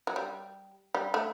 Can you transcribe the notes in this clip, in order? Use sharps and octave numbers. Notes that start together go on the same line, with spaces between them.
F#3
G3
G3
A3